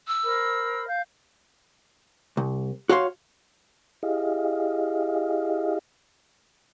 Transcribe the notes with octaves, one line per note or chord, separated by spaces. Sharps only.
E6
A#4 C5 B5
F5 G6
C2
F#4 C#5 F5 C6
E4 G4 G#4 D#5 F5